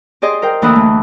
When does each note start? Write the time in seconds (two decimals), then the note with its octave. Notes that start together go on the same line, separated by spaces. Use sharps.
0.22 G4 G#4 D5 D#5 C6
0.42 A#4 C5 G5
0.62 D2 E3 A#3 E4 B4 D#6
0.76 A3